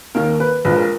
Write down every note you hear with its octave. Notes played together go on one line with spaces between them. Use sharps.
D#2 D#3 A#3 A#4
B4
A#1 A#2 G#3 B4
A#4